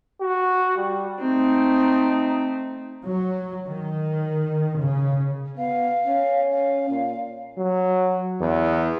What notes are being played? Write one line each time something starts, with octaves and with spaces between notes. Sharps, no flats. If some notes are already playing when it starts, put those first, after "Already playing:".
F#4
G3
A3 C4 D#4
F#3
D#3
C#3
B3 F5
C#4
F5
A#2
F#3
E2